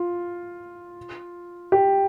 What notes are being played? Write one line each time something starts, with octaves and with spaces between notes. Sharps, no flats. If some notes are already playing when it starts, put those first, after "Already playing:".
Already playing: F4
G4